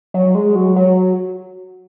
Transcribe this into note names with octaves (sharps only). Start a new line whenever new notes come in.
F#3
G#3
F#3
F#3